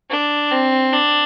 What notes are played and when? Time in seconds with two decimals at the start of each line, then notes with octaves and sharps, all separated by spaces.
0.10 D4
0.51 C4
0.93 D4